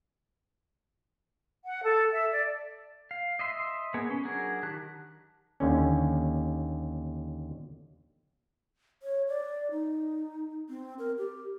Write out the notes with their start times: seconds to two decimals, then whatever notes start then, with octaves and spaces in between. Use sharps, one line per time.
1.65 F#5
1.82 A4
2.12 E5
2.32 D5
3.11 F5
3.39 D#5 E5 C6
3.94 A#3 B3 G#4
4.10 C#4
4.24 F#3 D4 F#4 G#4 A#4
4.63 D#3 G4 A5 F#6
5.60 D#2 D3 C#4
9.03 C#5
9.28 D5
9.71 D#4
10.69 C4
10.99 A#4
11.18 G4